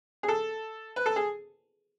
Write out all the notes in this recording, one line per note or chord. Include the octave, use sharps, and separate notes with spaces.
G#4
A4
B4
A4
G#4